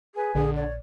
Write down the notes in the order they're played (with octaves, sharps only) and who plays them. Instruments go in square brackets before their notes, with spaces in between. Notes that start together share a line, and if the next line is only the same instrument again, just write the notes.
[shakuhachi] G#4 [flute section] B4 C#5 G#5
[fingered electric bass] A#1 [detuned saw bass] D3 [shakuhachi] G#4
[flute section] C#5 [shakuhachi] D5